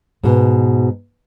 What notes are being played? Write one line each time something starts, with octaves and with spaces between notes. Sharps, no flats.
G#2 B2